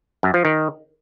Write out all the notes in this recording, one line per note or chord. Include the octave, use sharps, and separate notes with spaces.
F#2
F3
D#3